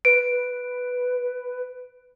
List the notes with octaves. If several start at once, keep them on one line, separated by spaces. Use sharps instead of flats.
B4 D7